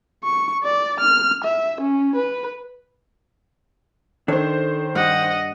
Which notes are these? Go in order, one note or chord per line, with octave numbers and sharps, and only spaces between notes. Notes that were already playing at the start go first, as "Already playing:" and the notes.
C#6
D5
F6
E5
C#4
B4
D#3 D4 A4 C5 C#5
G2 D#5 F#5